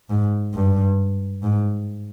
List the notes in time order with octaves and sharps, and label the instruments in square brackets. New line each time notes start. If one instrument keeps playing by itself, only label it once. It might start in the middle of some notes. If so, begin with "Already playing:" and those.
[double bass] G#2
G2
G#2